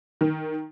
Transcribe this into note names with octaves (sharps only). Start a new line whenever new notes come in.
D#3